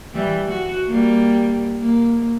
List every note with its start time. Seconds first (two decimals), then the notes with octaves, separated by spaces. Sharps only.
0.14 E3 G3
0.49 F#4
0.87 G3 A#3
1.79 A#3